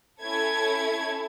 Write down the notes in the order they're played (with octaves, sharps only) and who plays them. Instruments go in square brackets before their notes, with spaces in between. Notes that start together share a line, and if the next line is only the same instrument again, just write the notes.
[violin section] C#4 E4 A4 G#6